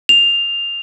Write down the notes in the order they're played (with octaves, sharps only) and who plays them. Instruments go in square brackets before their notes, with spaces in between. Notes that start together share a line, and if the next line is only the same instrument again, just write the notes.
[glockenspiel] F7